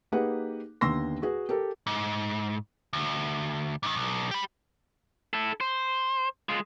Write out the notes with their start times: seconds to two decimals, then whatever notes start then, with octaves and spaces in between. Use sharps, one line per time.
0.12 A#3 D#4 G4 G#4 B4 F#5
0.81 D#2 D3 B3 C6 E6 A#6
1.22 F#4 G#4 B4
1.49 G4 A4 A#4
1.87 G#2
2.93 D2
3.83 G#2 D#3
3.96 B1
4.31 G4 B5
5.33 E4 A4
5.61 C5
6.49 G#3 F4